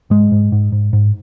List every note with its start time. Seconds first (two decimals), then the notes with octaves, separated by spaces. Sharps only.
0.10 G#2 G#3
0.32 G#2
0.52 G#2
0.72 G#2
0.93 G#2